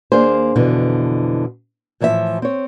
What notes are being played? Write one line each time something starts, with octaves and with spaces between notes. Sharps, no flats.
D#2 A#3 D4 G#4 C5
F2 B2 D3 E3
A2 E3 F3 A4 E5
C4 C#5